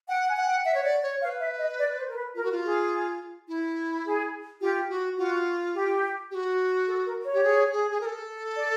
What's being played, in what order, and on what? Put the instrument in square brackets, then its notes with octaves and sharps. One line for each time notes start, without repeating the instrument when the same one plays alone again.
[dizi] F#5 [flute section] G5
[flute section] G#5
[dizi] F#5
[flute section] G5
[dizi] E5 [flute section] F#5
[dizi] C#5
D5
C#5
[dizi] C#5 [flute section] F5
[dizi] B4
[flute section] E5
D#5
D5
C5
A#4
B4
[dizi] F4 [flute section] A#4
[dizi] F#4
F4
[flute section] G#4
[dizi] E4
[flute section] G#4
[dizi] F4 [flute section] G4
[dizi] F#4
[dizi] F4 [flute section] F#4
[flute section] G4
[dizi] G4
F#4
[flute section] A4
A#4
C#5
[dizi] G4
G#4
G#4
G#4
A#4
A4
[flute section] D5